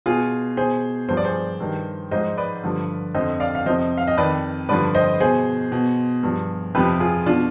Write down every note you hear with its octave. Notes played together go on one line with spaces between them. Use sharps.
B2 F4 G#4
B2 G#4 C5
G2 F3 C5
D5
G#4 C5
G2 D#3
G#2 F3 C5 D#5
B4 D5
G2 D3 F3
F2 D3 F3 C5 D#5
D5 F5
F5
F2 C3 F3 C5 D#5
F5
D#5
F2 D#3 B4 D5
G2 D3 F3 B4 D5
C5 D#5
B2 G#4 C5
B2
G2 F3
F2 C3 F3 G4 B4
F4 G#4
B2 D4 F4